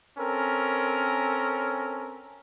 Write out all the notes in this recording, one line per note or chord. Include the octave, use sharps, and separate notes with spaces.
C4 C#4 A4 A#4